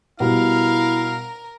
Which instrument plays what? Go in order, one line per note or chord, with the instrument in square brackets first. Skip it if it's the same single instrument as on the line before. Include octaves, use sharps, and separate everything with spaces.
[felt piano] B2 G3 [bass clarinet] E4 [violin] A#4 [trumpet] F5